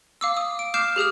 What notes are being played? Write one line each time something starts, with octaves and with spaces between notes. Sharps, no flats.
F5 D6 E6
D#6
D7
D6 F6 G6 C7 E7
G4 G#4 D#6 F6